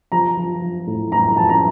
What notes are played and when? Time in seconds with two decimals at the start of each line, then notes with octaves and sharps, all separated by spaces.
0.12 F3 A#5
0.37 F3
0.62 F3
0.87 A2
1.12 A2 A#5
1.24 A#5
1.36 F3 A5
1.49 A#5